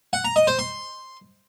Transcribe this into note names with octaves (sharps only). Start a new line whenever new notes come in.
F#5
A#5
D#5
C5
C6